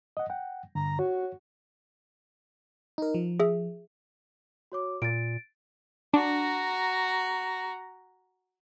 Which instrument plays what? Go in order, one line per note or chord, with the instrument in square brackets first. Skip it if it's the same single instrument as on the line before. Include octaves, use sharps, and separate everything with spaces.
[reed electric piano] D#5 F#5
F#5 G5
[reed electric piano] G2 D3 [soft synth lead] A#5
[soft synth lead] F#4 [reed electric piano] C#5
[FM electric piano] D#4 A#4
F3
[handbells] G#4 E5
[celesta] F#4 C#5 D6
[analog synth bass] A#2 [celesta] A6 D7
[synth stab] D4 [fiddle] F#4 A#5